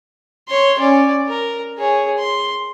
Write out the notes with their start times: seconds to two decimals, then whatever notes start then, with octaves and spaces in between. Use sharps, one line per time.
0.48 C#5 C6
0.79 C#4 D5
1.28 A#4
1.78 G#4 C#5
2.18 C6